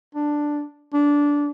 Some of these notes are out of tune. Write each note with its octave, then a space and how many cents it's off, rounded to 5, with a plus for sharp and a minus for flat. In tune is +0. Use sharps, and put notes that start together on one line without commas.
D4 +5
D4 -15